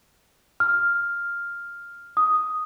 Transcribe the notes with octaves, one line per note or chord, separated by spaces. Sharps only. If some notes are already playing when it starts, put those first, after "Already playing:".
F6
D#6